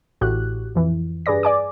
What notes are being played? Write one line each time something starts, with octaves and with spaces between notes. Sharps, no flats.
A1 A2 F#4 G4 F#6
F2 E3
G2 G#4 B4 D5 A#6
D5 G#5 D6